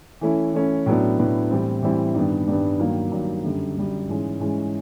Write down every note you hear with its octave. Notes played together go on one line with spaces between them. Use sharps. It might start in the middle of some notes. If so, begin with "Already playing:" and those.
E3 A3 C#4 E4
E3 A3 C#4 E4
A2 F#3 B3 D4
A2 F#3 B3 D4
A2 E3 G3 C4 E4
A2 E3 G3 C4 E4
G2 D#3 G3 B3 D4
G2 D#3 G3 B3 D4
G2 D#3 F#3 A#3
G2 D#3 F#3 A#3
F#2 D3 G3
F#2 D3 G3
G#2 E3 G#3 C#4
G#2 E3 G#3 C#4